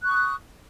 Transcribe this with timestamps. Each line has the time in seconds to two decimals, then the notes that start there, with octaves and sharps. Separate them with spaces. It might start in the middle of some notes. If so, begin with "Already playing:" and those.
0.01 F#6
0.06 C#6
0.10 D#6